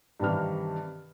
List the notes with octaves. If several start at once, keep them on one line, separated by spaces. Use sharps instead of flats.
G2 C3 D#3 E3 F6